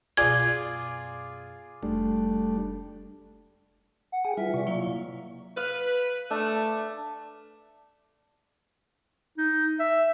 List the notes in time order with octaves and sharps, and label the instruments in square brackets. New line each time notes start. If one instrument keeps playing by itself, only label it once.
[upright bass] F#2 B2 [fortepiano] F4 G#4 D5 [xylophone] G#6
[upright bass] F1 [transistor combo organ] G3 A3 D4
[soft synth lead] F#5
[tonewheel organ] G#4 G5 G#5
[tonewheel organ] G3 E4 [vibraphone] F4 B4 [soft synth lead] E5
[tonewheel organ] C3 D5 C#6
[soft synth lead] F#3 [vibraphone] A#3 E4 F5
[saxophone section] B4 [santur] F5
[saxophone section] A3 [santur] D4
[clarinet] D#4
E5